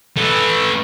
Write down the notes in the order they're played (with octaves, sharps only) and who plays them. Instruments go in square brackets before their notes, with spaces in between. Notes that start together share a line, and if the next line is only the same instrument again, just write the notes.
[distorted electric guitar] A3 B4